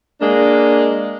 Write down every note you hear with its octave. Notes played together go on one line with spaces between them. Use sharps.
G#3 A#3 D4